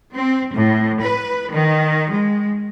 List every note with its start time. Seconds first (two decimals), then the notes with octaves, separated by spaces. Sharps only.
0.13 C4
0.54 A2
1.02 B4
1.50 D#3
2.11 G#3